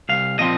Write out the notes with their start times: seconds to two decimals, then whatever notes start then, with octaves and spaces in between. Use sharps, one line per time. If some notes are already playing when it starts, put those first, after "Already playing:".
0.09 C2 F5
0.39 A#2 F3 C4 D#5